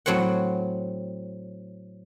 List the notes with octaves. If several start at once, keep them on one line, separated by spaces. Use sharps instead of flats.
A2 F#3 C4 C#5 F#5